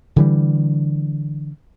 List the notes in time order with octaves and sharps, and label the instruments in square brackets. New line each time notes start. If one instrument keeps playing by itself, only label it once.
[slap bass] D3 E3 G3